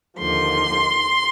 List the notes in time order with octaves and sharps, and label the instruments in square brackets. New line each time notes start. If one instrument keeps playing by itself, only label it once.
[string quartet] D#2 D3 F3 C6